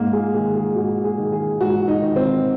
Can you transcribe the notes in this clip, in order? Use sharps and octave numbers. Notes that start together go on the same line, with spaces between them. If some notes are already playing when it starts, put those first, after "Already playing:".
Already playing: G#2 A#3
G#4
D#3 G#4
G#4
G#2 F#4
G#4
D#3
G#4
G#2 F#4
D#4
D#3
C4